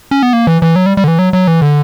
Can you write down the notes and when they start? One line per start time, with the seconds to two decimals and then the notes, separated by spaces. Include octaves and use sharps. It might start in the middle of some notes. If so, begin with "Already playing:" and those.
0.11 C#4
0.23 B3
0.33 A#3
0.47 E3
0.62 E3
0.76 F#3
0.86 G3
0.97 G3
1.04 D3
1.08 E3
1.19 F#3
1.33 F#3
1.48 E3
1.62 D3